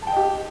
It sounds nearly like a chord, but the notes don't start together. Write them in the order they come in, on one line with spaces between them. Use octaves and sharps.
A5 G5 D#5 G4